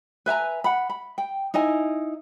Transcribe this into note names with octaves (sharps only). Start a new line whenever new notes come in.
B4 E5 G#5 A#5
F#5 B5
B5
G5
D#4 E4 D#5 G#5